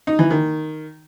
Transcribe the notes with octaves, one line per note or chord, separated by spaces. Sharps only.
D#4
E3
D#3